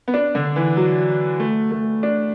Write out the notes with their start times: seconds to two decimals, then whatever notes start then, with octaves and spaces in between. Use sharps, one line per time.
0.08 B3
0.14 D4
0.35 D3
0.56 E3
0.77 F#3
1.40 A3
1.71 A3
2.03 D4